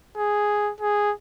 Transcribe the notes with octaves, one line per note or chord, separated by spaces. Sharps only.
G#4
G#4